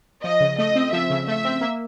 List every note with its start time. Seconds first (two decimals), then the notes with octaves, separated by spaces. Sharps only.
0.24 F3 D#5
0.41 C#3
0.58 A3 D#5
0.75 C4
0.92 F3 E5
1.10 C#3
1.28 A3 E5
1.45 C4
1.61 A#3